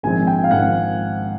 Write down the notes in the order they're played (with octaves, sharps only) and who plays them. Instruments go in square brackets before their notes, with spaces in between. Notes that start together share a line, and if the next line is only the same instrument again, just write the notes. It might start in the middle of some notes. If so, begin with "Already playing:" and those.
[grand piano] A#1 G#2 D#3 G#3 C4 G#5
G5
F5
A#1 G#2 D#3 G#3 C4 F#5